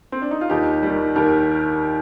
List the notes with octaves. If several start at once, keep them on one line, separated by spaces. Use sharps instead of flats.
C4
D4
D#4
F4
D#2 D#4 G4
D#3 G3
D#2 G4 A#4